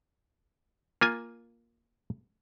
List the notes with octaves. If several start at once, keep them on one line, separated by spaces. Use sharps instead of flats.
A#3 F4 G#5